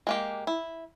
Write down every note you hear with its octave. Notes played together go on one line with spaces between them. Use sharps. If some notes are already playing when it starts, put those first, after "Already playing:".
G#3 A#3 G4
E4